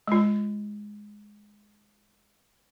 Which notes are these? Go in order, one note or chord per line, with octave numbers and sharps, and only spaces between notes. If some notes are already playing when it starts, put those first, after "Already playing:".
G#3 F4